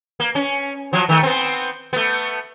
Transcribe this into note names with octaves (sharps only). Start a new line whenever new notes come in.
A#3
C#4
F3 F#3
D#3 A3
B3 C4
A3 B3